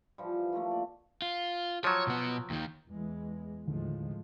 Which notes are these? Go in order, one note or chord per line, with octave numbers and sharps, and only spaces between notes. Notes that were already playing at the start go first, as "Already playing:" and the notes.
E3 F3 G3
D#3 F3 A3 A#3
D5
F4
F3 F#3 C#5
B2 B3
D#2 D#3
E2 E3 G#3
D#2 A2 D3 D#3 F3 G#3